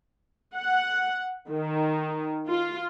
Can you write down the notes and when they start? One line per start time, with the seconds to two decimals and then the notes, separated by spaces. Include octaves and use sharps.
0.54 F#5
1.51 D#3
2.49 F4